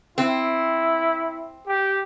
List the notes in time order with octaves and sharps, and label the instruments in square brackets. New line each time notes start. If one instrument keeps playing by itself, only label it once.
[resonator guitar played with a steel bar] C4 [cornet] E4
[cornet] G4